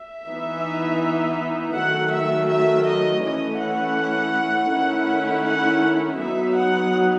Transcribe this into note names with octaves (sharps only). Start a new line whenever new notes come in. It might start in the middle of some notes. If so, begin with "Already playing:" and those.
Already playing: E5
E3 B3 D#4
D#3 F#3 A3 F#5
E5
E5
D#5
E3 A3 C#4 E4 D#5
F#5
D#3 A3 C#4 E4
F#5
F#3 B3 D#4 E5
F#5